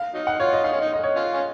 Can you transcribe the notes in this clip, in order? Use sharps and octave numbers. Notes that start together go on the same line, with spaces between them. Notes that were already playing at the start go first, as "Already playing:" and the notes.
Already playing: F5
F#3 D#4
F#5
F4 C#5
D#5
D#4 F5
C#4
D#4
D#5
C#5
C#4 F4
C#4